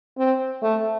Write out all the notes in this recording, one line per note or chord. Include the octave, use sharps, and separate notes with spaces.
C4
A3